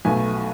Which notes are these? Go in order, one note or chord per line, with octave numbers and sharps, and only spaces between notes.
B1 B2 A3 G#5